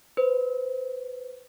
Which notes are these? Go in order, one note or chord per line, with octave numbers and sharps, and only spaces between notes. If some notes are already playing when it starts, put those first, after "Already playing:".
B4 C5